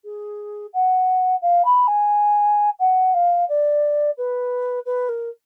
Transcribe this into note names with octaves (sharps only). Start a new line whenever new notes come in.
G#4
F#5
F5
B5
G#5
F#5
F5
D5
B4
B4
A#4